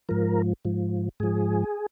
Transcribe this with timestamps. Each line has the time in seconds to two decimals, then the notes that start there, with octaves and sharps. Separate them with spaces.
0.09 G#2 F3 A#4
0.65 G#2 F3
1.20 G#2 F3 G#4